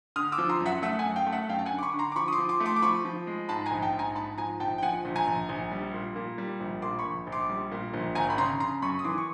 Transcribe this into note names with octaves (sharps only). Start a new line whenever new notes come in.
D3 D#6 F6
D6 E6
F3
A#5 C6
F#2
E5 F#5
A3 E5 F#5
F#5 G#5
F#2
F5 G5
A3
E5 F#5
F#2 F5 G5
A5
F#5 G#5
D3
D6
B5 C#6
D3
A#5 C6
D6
F3 B5 C#6
D#6
C6 D6
F3
C6 D6
A3
C6 D6
D6
F3 B5 C#6
F3
G#3
G#2 A5 B5
G#5 A#5
A#1
G5 A5
G#2
G#5 A#5
G#2 A5 B5
F3 G#5 A#5
A#1 G5 A5
G5
F3 F#5 G#5
A#1
G#5 A#5
A#1
A#1
G3
A#2
A#2
G3
A#1
A#2 C6 D6
B5 C#6
A#1
A#1
C6 D6
G3
A#2
A#1
G#1 G#5 A#5
B5
C#3 A#5 C6
C#3 A#5 C6
F#2 B5 C#6
D#6
E3 C6 D6
C#6